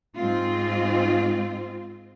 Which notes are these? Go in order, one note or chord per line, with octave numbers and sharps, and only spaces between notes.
G#2 C4 F4